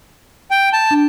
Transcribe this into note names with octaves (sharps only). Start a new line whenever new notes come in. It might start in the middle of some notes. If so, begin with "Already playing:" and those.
G5
A5
D4